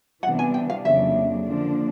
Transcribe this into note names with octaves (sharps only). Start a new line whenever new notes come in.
C3 E3 G3 B3 D4 F#5
G#5
G5
F5
F2 C#3 F#3 A#3 D4 E5
D3 F3 A#3 D4